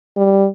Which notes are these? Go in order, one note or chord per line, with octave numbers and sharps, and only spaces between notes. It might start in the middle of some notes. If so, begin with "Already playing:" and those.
G3